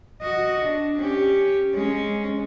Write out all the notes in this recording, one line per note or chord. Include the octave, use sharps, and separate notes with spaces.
F#4 D#5
D4
C#4 G4
G#3 C#4